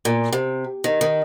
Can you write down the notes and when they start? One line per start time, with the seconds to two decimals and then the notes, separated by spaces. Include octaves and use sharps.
0.05 A#2
0.33 C3
0.84 D#3
1.01 D#3